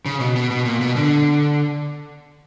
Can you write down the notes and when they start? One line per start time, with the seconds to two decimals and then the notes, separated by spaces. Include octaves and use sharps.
0.06 C#3
0.20 B2
0.36 B2
0.50 B2
0.65 A#2
0.81 B2
0.96 D3